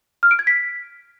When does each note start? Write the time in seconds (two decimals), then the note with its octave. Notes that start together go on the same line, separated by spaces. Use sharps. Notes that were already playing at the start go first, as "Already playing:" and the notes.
0.23 F6
0.31 D7
0.39 G#6
0.47 B6